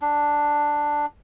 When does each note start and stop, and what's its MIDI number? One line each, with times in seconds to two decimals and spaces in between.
0.02 1.06 62